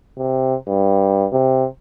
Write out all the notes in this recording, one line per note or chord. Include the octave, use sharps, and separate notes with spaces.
C3
G2
C3